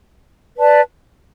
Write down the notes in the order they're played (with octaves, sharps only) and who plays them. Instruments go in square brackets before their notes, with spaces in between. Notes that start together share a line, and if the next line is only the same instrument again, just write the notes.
[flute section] B4 D5 A5